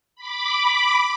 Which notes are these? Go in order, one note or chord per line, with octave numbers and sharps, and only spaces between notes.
B5 D6